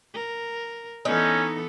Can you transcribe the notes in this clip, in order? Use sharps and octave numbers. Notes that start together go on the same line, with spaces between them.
A#4
E3 B3 C#4 D#4 A4